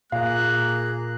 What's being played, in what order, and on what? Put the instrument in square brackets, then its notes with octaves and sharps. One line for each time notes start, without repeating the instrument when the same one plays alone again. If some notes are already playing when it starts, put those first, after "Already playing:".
[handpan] A#2 [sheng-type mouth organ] A#3 G#4 A#5 [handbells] F5 [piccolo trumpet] F#6